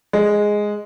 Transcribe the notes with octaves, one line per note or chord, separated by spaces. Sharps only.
G#3